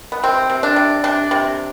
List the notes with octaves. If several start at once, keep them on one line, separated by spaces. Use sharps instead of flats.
B3
C3 C4
C3
D4
C3
C3 D4
C3